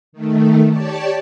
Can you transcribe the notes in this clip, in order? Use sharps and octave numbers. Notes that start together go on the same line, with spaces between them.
D#3 A3
G4 C#5 D5 A5